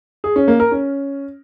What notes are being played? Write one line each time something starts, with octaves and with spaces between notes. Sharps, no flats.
G#4
C#4
A#3
A#4
C#4